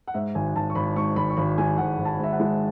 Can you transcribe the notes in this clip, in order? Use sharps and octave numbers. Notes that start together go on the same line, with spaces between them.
F#5
G#2 E5
G#1 G#5
G#1 A5
C#6
G#1 B5
G#2 C#6
G#1 B5
C#6
G#1 B5
G#3 G#5
G#1 F#5
G#1
A5
G#2 E5
F#5
G#3